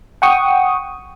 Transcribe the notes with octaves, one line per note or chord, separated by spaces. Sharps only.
F#5 G5 C#6 D#6